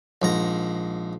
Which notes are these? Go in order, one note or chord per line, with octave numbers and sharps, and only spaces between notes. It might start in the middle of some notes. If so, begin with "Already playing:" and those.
A#1 G#2 A#5